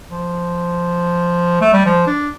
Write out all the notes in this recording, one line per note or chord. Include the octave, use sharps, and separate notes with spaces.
F3
A3
G3
F3
D4